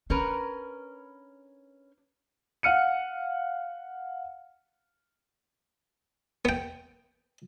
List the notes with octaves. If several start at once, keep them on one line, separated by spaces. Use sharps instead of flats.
C#4 D4 A#4 B4
F5 F#5 F6 C#7 D#7
B3 G5